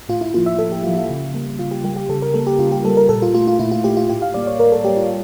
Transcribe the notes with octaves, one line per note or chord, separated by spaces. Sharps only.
A2 F4
E4
F3 A#3 F4
E5
A2 A4
G4
F3 A#3 F4
F4
C#3
G3 A#3
C#3 F4
G4
G3 A#3 G4
G4
C#3 A4
A#4
G3 A#3 A4
G4
C#3 F4
G4
G3 A#3 A4
A#4
A#2 A4
F4
A3 F4
F4
A#2 E4
F4
A3 G4
F4
A2 G4
F5
G3 A#3 D5
C#5
A2 A#4
A4
G3 A#3 G4
F4